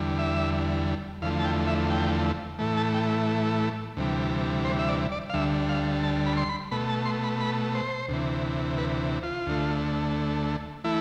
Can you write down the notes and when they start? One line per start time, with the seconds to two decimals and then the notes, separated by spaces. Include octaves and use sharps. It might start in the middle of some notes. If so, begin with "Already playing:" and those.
Already playing: E2 D3 G3
0.19 E5
1.22 E2 D3 F3 A3 F5
1.39 A5
1.44 G5
1.67 E5
1.90 G5
2.59 A2 E3 A3
2.77 A5
2.94 G5
3.97 D2 C3 E3 G3
4.65 C5
4.79 E5
4.89 D5
5.12 D5
5.30 F5
5.34 D2 D3 G3 E5
5.69 F5
6.03 A5
6.26 B5
6.37 C6
6.49 B5
6.71 B2 A3 B5
6.89 A5
7.06 C6
7.24 B5
7.40 B5
7.75 C5
8.08 D2 C3 E3
8.78 B4
9.23 F4
9.46 D2 D3 A3
10.84 E3 A3 E4